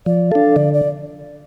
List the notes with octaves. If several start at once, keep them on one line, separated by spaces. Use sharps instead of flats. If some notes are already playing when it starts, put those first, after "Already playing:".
F3 D5
D4 A4 F5
D3 D5
D5